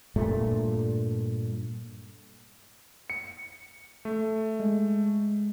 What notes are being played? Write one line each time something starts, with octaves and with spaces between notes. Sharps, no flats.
G2 A#2 A3
C#7
A3
G#3